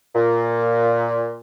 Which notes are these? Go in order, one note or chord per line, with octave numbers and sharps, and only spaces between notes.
A#2